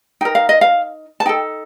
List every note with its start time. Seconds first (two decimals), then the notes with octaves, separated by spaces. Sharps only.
0.21 D#4 A#4 G5
0.35 F5
0.49 D#5
0.61 F5
1.20 A5
1.25 D#4 G5
1.29 A4